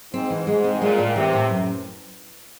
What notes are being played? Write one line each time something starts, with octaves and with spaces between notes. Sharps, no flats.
G#2 C4
E3
G#2 G#3
C4
A#2 G#3
A2
C3 E3
A2
F#2